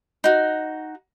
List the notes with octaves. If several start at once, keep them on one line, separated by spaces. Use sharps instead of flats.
D#4 F#4